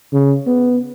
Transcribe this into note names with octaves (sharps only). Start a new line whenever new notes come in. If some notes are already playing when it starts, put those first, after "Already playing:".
C#3
B3